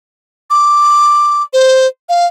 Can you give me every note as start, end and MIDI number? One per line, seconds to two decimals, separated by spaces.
0.50 1.42 86
1.53 1.87 72
2.09 2.26 77